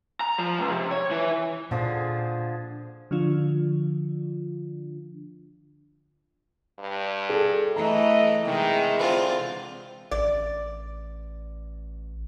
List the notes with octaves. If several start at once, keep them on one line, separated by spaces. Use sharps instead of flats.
A#5
F3
C#2
C3
C#5
E3
A#2 D3 F3 G#4
D3 F3 D4 F4
G2
G#4 A4
E3 A3 D#5 A#5
C3 D#3 E3 G#3
D3 C4 F4
A1 D5